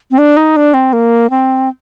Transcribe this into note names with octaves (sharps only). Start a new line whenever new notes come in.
C4
D4
D#4
D4
C4
A#3
C4